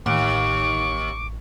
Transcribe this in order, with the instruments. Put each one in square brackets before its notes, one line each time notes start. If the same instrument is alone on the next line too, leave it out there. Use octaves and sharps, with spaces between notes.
[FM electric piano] A1 [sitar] D#2 [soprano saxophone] C#6 [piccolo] D6